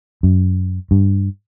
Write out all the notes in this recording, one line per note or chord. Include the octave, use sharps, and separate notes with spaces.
F#2
G2